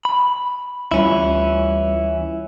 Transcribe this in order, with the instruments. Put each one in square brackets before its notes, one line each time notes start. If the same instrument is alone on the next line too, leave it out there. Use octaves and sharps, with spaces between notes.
[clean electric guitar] B5
[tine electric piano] D2 G3 F4 [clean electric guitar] E3 C#4 E4